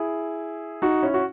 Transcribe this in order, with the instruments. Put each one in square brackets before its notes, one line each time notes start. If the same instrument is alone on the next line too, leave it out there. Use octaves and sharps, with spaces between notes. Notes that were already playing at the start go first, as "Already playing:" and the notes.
Already playing: [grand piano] E4 G#4
D#4 F#4
C#4 E4
F#4